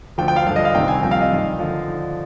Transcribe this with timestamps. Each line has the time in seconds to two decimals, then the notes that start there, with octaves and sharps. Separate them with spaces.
0.18 D2 D3 F3 G5
0.28 G5
0.36 F5
0.46 G2 D3 F3 F5
0.56 D#5
0.65 F5
0.75 C2 C3 D#3 G5
0.88 G#5
1.03 C2 C3 F3 G5
1.11 F5
1.21 D#5
1.31 G2 D#3
1.58 D3 F3